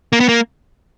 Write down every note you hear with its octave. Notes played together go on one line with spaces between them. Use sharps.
A#3
B3
A#3